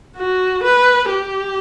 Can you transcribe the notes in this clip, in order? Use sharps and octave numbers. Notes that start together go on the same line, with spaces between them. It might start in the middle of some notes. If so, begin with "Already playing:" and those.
F#4
B4
G4